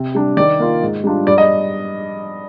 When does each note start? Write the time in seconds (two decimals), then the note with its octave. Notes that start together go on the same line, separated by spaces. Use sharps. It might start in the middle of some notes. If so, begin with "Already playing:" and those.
Already playing: C3
0.15 G3 D4
0.37 D#3 D5
0.59 A#3 F4
0.82 G#2
1.04 G3 D4 F4
1.27 G2 D5
1.38 D#5